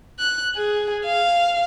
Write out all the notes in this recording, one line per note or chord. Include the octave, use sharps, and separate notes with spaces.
F#6
G#4
F5